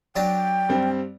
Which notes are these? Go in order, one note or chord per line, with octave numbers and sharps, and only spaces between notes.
F#3 D4 G5 A5
G2 G3 C4